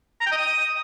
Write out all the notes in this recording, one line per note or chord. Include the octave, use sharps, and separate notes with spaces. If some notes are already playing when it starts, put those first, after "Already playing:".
A#5
G5
D#5
D#6